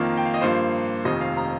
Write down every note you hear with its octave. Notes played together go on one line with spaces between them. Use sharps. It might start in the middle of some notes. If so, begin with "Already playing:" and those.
Already playing: F2 D#3 A#3 F4
G5
F5
D#5
G2 F3 A#3 C5
F1 F2 D#3 D#5
F5
A#5